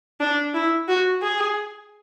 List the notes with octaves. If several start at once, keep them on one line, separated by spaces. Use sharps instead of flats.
D4
E4
F#4
G#4